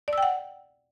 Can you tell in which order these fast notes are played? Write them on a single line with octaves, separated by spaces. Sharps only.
D5 E6 G5 F#5